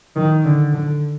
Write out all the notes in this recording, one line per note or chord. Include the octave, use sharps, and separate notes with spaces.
D#3
D3
D3